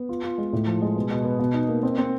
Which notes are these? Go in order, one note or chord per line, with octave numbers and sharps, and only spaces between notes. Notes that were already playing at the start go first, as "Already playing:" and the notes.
Already playing: B3
F4
F4
G#3
A2
F3
G#3
B2
B2
B3
B2
D#4
A#3
C4
C4